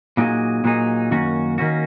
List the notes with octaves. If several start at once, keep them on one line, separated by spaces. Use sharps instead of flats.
A#2 F#3 A#3 D#4 G#4
A#2 F#3 A#3 D#4 G#4
F#2 D#3 A#3 C#4 F#4
D#3 A#3 C#4 F#4